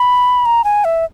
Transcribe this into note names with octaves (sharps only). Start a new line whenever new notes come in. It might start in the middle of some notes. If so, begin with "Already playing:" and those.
Already playing: B5
A#5
G#5
E5